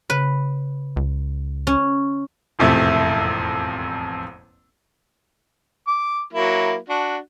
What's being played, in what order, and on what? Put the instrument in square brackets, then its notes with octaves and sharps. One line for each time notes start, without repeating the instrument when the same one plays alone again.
[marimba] C#3 [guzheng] B4
[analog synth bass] C#2
[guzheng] C#4
[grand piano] E1 A1 F2 C3 A3 E4
[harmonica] D6
F#3 A#3 E4
D4 F#4